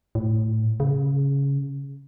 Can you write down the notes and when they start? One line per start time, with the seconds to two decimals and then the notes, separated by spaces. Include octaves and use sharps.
0.15 A2
0.80 C#3